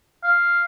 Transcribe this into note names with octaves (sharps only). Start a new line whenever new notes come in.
F5